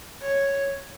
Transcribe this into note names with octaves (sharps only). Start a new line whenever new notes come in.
C#5